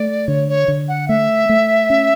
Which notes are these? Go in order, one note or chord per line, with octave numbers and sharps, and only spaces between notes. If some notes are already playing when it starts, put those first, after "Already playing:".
Already playing: A3 D5
D3 C#5
C#5
D3
F#5
A3 E5
A3
C#4